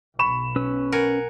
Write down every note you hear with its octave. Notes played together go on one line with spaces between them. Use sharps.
B1 B5 C#6 E7
C#4 B4 E6
A#4 F#5 G#5